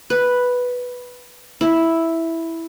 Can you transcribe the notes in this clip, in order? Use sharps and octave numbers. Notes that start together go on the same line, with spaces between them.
B4
E4